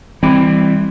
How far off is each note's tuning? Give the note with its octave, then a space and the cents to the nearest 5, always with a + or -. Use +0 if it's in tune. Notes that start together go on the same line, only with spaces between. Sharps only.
E3 +0 G3 +25 C4 +0